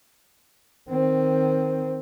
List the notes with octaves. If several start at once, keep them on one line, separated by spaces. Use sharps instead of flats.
D#3 C4